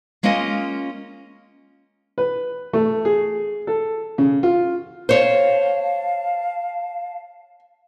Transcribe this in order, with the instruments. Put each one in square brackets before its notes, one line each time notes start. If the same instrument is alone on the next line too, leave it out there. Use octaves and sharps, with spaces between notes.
[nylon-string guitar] G#3 A#3 C#4 F4 D#5 G#5
[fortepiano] B4
A3
G#4
A4
C#3
F4
[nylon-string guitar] C5 C#5 [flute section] F5 A5